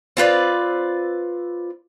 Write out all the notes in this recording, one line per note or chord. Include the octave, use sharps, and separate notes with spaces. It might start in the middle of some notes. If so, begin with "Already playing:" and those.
C4 F4 B4 D5